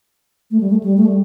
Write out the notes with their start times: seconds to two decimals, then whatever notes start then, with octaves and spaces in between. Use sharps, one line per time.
0.51 A3
0.60 G3
0.70 A3
0.84 G3
0.97 A3
1.06 G3